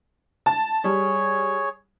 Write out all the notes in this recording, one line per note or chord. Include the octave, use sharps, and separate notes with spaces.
A5
G3 G#4 C#5